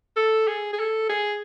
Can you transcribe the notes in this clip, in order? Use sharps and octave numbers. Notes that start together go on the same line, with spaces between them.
A4
G#4
G#4
A4
G#4